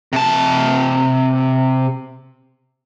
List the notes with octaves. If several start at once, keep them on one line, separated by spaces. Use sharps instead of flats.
C3 A5